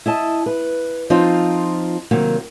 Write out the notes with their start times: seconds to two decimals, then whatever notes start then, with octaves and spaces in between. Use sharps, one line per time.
0.06 E4 D#5 A5
0.46 B4
1.10 F3 C4 D#4 F4
2.11 C3 D#3 F#3 A#3